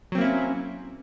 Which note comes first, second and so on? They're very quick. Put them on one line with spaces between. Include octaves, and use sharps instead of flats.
F#3 C4 A#3 E4 C#4